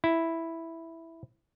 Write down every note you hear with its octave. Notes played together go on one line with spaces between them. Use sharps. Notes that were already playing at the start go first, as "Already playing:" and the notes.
E4